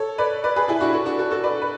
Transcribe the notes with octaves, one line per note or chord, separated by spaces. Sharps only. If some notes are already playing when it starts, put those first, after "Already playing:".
Already playing: A4 C#5
B4 D5
B4 D5
G#4 B4
E4 G#4
D4 F#4
F#4 A4
D4 F#4
F#4 A4
F#4 A4
B4 D5
B4